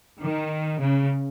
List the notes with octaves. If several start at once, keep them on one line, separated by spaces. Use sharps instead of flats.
D#3
C#3